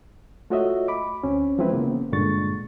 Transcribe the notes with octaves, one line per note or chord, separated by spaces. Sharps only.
A3 F4 F#4 C#5 D#5 E5
B5 D6
D2 C4 C#4
E3 F3 G#3 C4 E4 B4
C#3 A#3 B3
G2 A#2 D3 G#3 C#6 A6